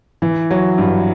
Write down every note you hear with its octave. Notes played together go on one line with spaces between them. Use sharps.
E3
F#3
G2